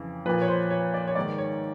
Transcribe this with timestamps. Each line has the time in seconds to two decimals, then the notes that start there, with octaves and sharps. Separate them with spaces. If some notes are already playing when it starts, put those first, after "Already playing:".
Already playing: F2 C#3 E3
0.26 A#2 F3 B4
0.42 C#5
0.48 C5
0.70 C#5
0.94 D5
1.08 C#5
1.15 G#2 D#3 D5
1.38 C#5